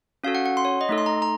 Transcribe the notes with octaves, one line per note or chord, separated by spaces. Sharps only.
C#4 F#4 A4 F5
F#5
F#5
C6
C#5
D#5
A3 D#4 A4
C6
A#5
A#5